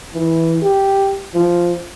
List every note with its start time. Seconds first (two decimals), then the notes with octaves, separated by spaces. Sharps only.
0.14 E3
0.62 G4
1.34 F3